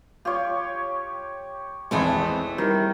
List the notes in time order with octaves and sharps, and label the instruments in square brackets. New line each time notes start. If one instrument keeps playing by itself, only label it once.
[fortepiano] F4 [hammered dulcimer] G4 C#5
[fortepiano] G#1 E2 G#3 [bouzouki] E3 A3 C5 [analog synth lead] C4
[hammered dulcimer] D#3 [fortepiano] G3 [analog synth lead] E4